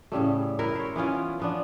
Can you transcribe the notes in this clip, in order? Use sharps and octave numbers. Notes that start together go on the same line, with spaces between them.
A2 C#3 G3 A3
E4 A#4 B4 E5
C5 C#5
E3 B3 C#4 F4
F3 B3 D4